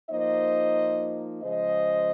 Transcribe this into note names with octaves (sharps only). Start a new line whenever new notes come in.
F3 A#3 D#4 C5 D#5
C#3 F3 G#3 C5 D#5